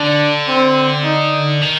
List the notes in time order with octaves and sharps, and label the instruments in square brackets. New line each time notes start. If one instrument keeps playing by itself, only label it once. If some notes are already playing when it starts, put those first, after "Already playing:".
Already playing: [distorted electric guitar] D3 [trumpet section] D4
[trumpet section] C4
D#4
[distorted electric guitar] D#3